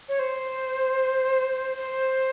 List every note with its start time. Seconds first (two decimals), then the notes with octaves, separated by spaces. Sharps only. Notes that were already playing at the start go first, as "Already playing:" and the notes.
0.09 C#5
0.19 C5
1.77 C5